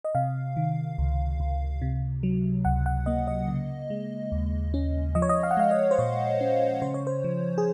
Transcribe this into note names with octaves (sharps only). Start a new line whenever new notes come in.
D#5
C3 F5
D#3
C#2
C#2
C3
F#3
C#2 F#5
F#5
A#3 D#5
D#5
C#3
G#3
D#2
C#4
F3 D#5
C#5
D#5
F5
F#5
G#3 F5
D#5
C5
A#2 C#5
C#4
C#3 C5
C#5
C5
F3
G#4